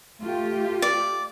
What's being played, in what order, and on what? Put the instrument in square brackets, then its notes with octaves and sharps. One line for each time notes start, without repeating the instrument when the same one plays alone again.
[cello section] A3 F4 G4
[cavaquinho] D5